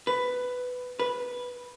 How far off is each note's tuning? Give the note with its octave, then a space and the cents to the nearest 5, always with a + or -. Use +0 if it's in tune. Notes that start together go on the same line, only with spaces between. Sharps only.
B4 +10
B4 -5